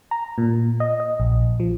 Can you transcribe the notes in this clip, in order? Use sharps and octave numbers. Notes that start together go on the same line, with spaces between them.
A#5
A#2
D#5
D#5
A#1
F3